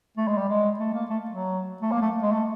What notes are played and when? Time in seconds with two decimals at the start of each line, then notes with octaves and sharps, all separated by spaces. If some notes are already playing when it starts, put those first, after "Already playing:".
0.17 A3
0.28 G#3
0.37 G3
0.49 G#3
0.79 A3
0.94 A#3
1.10 A3
1.30 F#3
1.82 A3
1.91 A#3
2.02 A3
2.22 G#3
2.32 A3